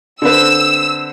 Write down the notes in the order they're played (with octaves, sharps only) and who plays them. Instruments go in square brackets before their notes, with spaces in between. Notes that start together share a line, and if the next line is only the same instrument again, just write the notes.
[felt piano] D3 C4 B4 [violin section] E6